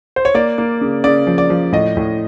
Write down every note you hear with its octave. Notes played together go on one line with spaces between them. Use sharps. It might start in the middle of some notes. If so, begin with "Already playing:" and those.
C5
C#5
A#3 D5
A#3
C#3
C#3 D5
F3
D5
F3
A2 D#5
A2